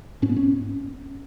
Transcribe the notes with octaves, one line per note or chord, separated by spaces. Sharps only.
G#2 C#4
B3
C#4